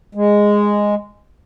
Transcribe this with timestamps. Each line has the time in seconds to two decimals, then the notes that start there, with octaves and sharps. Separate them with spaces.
0.15 G#3